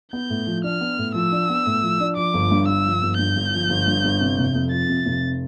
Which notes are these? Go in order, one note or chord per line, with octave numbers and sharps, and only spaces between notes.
B3 G6
A2
F3
D4 F6
B3
A2
F3 E6
D4
B3
A2
F3
D4
F3 D6
G1
G2
G1 E6
F3
G1
G2 G6
G1
F3
G1
G2
G1
C3
F1
F2
F3 A6
C3
F1